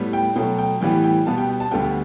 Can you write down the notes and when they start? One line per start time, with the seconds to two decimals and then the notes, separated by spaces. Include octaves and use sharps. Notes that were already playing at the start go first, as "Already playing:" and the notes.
Already playing: A2 G3 B3
0.13 G5
0.36 B2 F#3 A3 G5
0.58 G5
0.81 A2 E3 G3 B3 G5
1.04 G5
1.26 B2 G3 B3 A5
1.38 G5
1.49 G5
1.60 A5
1.71 D2 D3 G3 B3 G5